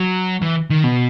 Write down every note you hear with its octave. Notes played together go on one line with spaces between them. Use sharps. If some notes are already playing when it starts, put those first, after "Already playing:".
Already playing: F#3
E3
D#3
B2